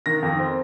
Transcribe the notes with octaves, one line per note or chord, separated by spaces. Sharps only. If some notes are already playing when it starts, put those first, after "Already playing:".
D#3 A#6
F2
C4